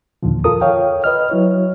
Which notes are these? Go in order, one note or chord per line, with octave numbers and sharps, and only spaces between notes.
D#2 A#2 D3 D#3 F3
F2 F4 A4 A#4 D#6
C#5 F5 G5
B4 D#5 F6
F#3 E4 C#5